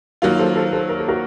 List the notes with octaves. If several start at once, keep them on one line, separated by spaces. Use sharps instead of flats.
D#3 F#3 A#3 F4 F#4 A#4
A4 C5
A4 C5
A4 C5
A#4
A4
F#4 A#4